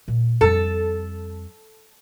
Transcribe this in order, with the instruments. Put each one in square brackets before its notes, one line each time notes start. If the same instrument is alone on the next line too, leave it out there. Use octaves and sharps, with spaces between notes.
[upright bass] A#2
[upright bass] F2 G3 [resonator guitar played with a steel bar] A4